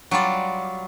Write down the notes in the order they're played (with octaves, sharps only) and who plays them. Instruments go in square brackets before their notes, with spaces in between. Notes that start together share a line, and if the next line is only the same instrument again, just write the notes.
[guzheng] F#3 G3 F4 D5